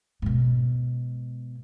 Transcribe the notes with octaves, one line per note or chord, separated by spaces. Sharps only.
G#2 B2